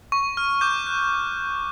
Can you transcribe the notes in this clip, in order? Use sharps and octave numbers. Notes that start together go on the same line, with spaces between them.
C#6
F6
D6 G6
F#6